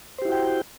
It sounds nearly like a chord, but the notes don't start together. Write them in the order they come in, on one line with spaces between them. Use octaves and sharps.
C5 G4 E4 F#4 G5